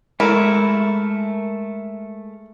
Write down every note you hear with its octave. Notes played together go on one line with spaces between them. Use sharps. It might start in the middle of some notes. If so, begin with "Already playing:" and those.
G#3 A3 E4 A#4